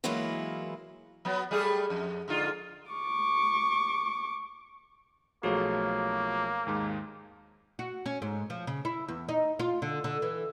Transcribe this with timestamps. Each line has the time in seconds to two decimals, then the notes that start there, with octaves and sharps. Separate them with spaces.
0.04 E3 F#3 G#3 A#3 E4 F4
1.25 F#3 B3
1.51 G3 A3 G#4
1.90 F2
2.28 G#2 D3 F4
2.91 C#6 D6
5.43 B1 F3 A3 A#3 F#4 G#4 C#5
6.67 D#2 G#2 G#3
7.79 F#4
8.06 C#4
8.22 G#2
8.50 F3
8.67 C#3
8.85 E4
9.08 E2
9.29 D#4
9.59 F4
9.82 D3
10.04 D3
10.22 E3